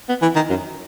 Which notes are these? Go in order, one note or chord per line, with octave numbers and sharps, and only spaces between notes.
B3
E3
D#3
F#2